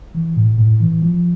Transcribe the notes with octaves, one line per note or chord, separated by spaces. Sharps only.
E3
A2
A2
E3
F3